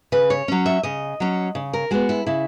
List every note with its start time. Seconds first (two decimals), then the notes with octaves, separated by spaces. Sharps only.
0.12 C#3 B4
0.30 C#5
0.48 F#3 C#4
0.66 E5
0.83 C#3 D#5
1.20 F#3 C#4
1.55 C#3
1.73 A#4
1.91 G#3 B3 F#4
2.09 E4
2.27 C#3 E4